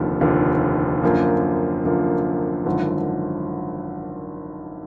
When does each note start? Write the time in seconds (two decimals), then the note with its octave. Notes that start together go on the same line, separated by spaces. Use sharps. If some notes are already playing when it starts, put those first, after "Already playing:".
Already playing: F1 D#2 D3 F3
0.20 F1 D#2 D3 F3
1.03 F#2 D3 F3 A#3
1.85 F#2 D3 F3 A#3
2.66 G#1 F#2 D3 F3